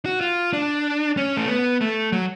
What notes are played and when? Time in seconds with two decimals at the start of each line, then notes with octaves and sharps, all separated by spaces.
0.06 F#4
0.21 F4
0.53 D4
1.17 C#4
1.37 A3
1.48 B3
1.81 A3
2.12 F#3